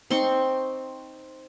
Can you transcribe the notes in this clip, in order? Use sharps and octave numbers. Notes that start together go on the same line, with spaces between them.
C4 D#4 C6 C#6